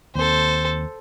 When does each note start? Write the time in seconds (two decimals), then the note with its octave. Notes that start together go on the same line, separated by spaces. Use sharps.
0.15 D#2 C4 A4 C5